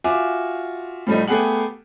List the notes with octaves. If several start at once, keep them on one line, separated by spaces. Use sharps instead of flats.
F4 F#4 E5 G#5 D6
A2 F3 G3 A3 D#4
A3 B3 G4 G#4 F#5 F#7